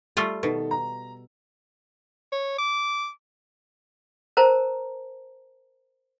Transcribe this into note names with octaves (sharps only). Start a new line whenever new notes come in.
G3 A3 F4
B2 D#3 A4
A#5
C#5
D6
A#4 C5 A5 A#5